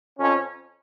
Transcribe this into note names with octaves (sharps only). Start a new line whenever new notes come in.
F2 F3 C#4